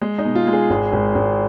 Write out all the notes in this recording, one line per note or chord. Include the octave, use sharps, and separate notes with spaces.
G#3
D#4
B2
F4
G#3
G#4
G#1
G#1
G#1